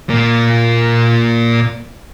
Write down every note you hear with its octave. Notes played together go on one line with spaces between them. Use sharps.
A#2 A#3